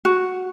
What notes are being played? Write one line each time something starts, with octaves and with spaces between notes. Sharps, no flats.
F#4